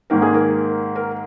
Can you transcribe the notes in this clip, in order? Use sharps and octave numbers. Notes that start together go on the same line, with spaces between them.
G#2 D#3 A#3 A#4
G#4
A#4
A#4